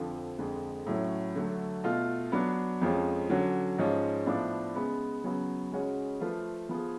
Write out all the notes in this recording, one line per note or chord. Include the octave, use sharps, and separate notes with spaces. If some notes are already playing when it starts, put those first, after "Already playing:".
Already playing: F2 D3 F3
F2 D3 G#3
A2 F#3 C#4
D3 F#3 A3
B2 A3 F4
F#3 B3 D4
F2 F3 G#3 C#4
D3 F#3 C#4 F#4
G#2 F3 G#3 C#4
A2 F3 B3 D4
C#3 G#3 B3
C#3 F#3 B3
C#3 G#3 C#4 F#4
F3 A3 F4 B4
F3 B3 F4 G#4